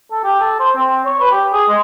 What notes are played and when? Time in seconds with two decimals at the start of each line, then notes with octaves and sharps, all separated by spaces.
0.11 A4
0.24 G4
0.40 A4
0.60 C5
0.76 C4
1.05 C#5
1.20 B4
1.31 G4
1.53 G#4
1.69 G#3